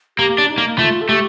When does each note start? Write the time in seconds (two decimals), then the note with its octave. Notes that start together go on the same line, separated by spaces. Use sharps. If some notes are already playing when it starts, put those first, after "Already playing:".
0.18 A#3 G4
0.38 D4
0.48 D#4
0.58 A#3
0.78 A3 F4
1.01 A4
1.08 A3 G4